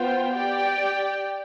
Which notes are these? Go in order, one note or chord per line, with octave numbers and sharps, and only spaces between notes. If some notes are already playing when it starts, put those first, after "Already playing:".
Already playing: B3 F4 C5 G5
G4 D5 G5